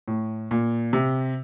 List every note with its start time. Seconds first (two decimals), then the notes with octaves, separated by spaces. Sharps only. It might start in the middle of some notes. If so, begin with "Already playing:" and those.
0.08 A2
0.51 A#2
0.93 C3